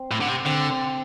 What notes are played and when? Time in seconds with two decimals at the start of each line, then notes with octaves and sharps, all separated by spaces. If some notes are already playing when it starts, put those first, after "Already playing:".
Already playing: C4
0.11 A2
0.21 D3
0.29 C3
0.46 D3 C4
0.69 C4